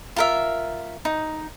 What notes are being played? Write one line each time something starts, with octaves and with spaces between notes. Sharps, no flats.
F4 A#4 E5
D#4